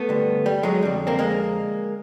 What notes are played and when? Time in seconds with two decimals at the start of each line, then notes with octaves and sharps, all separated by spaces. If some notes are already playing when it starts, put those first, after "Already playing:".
Already playing: A3 B3
0.09 G2 D3
0.46 G3
0.63 F#3 G#3
0.82 F2 D3 G3
1.07 A#3 C4
1.19 G#3 A#3